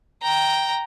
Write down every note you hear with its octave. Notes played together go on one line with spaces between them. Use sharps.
G5 A#5